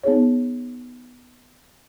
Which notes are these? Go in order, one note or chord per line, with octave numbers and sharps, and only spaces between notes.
B3 D#4 G#4 C#5